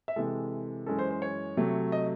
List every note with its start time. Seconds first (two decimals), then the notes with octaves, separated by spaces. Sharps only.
0.08 E5
0.16 C3 E3 G#3 A4
0.86 F#2 E3 G#3 C#4 A4
0.99 C5
1.11 C5
1.22 C#5
1.57 C3 F#3 A3
1.92 D#5